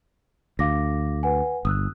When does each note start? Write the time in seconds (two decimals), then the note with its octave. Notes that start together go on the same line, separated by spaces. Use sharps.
0.59 D2 F5 D6 A#6
1.23 B4 F#5 G#5
1.65 G1 D#6 E6 F#6